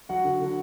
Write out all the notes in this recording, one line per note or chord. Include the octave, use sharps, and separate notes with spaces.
F#3 F#4 F#5
D3
D3